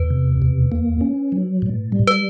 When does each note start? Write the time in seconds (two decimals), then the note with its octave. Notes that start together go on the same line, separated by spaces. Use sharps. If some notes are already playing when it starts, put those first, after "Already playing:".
Already playing: E2 B4
0.10 C3
0.42 E2
0.72 A#3
1.01 C#4
1.32 F#3
1.62 A2
1.92 G3
2.07 B4